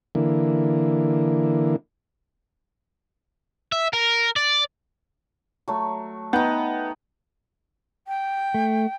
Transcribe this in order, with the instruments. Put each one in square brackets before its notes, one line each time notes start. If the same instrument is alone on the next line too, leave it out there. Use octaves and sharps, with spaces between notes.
[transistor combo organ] D3 E3 A#3
[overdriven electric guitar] E5
A#4
D5
[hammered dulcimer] F#3 A3
[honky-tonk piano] B3 [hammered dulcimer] D#4 G5
[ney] G5
[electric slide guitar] A3